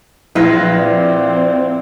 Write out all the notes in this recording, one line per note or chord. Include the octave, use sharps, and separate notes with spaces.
A#1 E4 B4 C5 F5 A#6
C4 D5